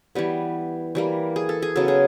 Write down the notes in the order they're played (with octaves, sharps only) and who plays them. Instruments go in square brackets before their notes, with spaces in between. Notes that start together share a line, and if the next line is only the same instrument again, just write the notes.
[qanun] E3 G3 B3
E3 G3 A#3
G#4
A4
G#4
C#3 F#3 B3 A4
G#4